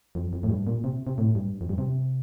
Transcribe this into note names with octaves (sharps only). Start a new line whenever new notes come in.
F2
F2
A2
G2
A#2
C3
C3
A2
G2
F2
G2
C3